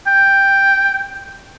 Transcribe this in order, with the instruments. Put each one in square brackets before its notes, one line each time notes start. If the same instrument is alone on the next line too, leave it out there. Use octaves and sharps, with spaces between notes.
[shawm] G5